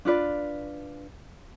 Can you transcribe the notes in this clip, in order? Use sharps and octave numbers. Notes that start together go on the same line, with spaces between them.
D4 F4 B4 D5